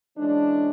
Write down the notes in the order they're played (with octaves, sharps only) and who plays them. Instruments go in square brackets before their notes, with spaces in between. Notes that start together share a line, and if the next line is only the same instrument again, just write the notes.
[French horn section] E3 G#3 C#4 D4